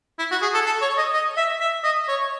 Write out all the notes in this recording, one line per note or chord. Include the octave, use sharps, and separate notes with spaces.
E4
F#4
G#4
A4
A4
C#5
D#5
D#5
E5
E5
D#5
C#5